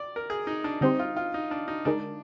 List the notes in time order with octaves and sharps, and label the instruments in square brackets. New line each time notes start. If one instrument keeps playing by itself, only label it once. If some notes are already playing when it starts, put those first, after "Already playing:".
Already playing: [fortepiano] D5
A#4
G#4
D#4
D4
[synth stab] D3 G3 C4 G4 C5 [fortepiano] D#4
[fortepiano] F4
F4
D#4
D4
D#4
[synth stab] D3 G#3 D#4 A#4 [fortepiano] D4